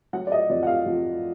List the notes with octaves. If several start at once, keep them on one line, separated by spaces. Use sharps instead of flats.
F#3 F#5
D5
D#5
F2 D5
F#5
F5
F2